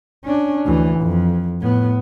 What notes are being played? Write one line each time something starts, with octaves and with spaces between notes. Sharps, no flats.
C#4 D4
D2 E3
F2
A2 B3